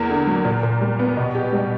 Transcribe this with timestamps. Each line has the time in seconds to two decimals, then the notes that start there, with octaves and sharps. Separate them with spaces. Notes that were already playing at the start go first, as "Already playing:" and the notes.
Already playing: E2 A#3
0.10 D3
0.27 F#3
0.45 A#2
0.63 A#2
0.81 G3
0.99 B3
1.17 B2
1.35 G4
1.53 G3